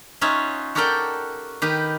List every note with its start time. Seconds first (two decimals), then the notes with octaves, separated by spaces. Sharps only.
0.21 C#4 D#4 F4 C#5 E5 F#5
0.75 F#4 G4 A4 A#4 D5 G5
1.62 D#3 G4 B4